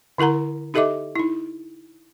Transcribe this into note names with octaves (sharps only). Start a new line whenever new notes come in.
D3 E4 A#4 F#5 A#5
D#4 G4 A4 D#5 E5 D6
D#4 E4